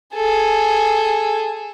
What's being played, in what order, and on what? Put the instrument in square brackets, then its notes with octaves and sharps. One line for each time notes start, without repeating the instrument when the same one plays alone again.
[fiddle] G#4 A4